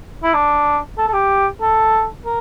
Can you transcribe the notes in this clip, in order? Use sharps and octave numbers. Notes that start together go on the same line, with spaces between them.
E4
D4
A4
A4
G4
A4
A#4